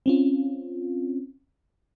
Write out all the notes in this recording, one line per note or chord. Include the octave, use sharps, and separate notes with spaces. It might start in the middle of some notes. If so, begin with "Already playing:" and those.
C4 C#4 F4